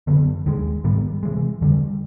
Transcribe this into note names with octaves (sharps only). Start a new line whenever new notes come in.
F#2 D3 F#3 B3
D#2 D#3 G#3
G#2 D#3 G3 B3
C3 E3 G#3
F2 D3 G3